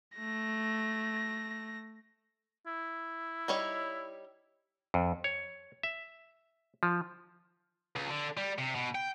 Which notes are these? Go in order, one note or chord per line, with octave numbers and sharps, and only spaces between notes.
A3 A#6
E4
G3 D#4 C#5
F2
C#5
E5
F3
C#2
D3
G3
C3
B2
G5